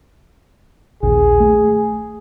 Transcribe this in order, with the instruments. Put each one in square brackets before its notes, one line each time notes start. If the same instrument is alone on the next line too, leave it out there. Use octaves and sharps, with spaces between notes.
[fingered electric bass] A#1 D#2 [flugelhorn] G#4
[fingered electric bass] A3